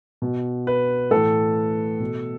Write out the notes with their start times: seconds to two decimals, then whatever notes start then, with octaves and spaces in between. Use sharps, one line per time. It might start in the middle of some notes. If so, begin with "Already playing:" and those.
0.22 B2
0.67 B4
1.11 A2 E3 A4
2.00 B2